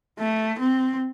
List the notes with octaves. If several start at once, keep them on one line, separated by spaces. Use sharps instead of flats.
A3
C4